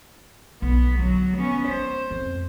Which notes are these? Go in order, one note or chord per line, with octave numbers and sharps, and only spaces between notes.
B1 B3
D3 F#3
B3 C#4
G#3 C5
F2